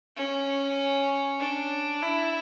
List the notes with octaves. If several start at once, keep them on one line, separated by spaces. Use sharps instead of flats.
C#4
D4
E4